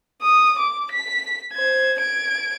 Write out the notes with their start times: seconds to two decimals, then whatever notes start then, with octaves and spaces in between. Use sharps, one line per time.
0.22 D#6
0.59 D6
0.92 B6
1.53 C5 G#6
1.99 G#6 D7